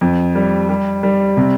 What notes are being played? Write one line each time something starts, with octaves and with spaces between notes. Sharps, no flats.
F2
G3
G3
G3
C3